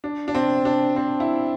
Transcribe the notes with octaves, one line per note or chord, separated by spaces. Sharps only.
D4
D4
C4
D4
C4
E4